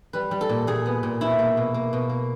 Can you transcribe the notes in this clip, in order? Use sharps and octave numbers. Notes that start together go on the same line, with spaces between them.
G3 B4
G3
A4
A#2
A#2 G#4
B3
A#2
B2 E4
A#3
B2
A#3
B2
A#3